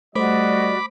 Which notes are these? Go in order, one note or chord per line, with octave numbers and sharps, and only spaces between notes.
G3 A3 F#4 C5 D5 D#5 B5 D6